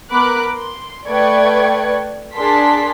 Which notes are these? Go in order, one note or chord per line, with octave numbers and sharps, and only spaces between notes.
B3 A#4 B5 D6 F#6
C6
A3 B4 D5 G5 C#6 G#6
D4 G#4 A#4 A5 C6 B6